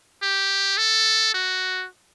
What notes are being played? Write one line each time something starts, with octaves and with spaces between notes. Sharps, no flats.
G4
A4
F#4